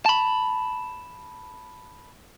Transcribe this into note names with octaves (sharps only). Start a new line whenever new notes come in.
A5 B5